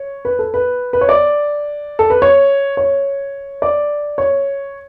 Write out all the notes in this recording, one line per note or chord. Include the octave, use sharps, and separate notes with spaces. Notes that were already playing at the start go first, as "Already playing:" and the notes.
Already playing: C#5
B4
A4
B4
B4
C#5
D5
A4
B4
C#5
C#5
D5
C#5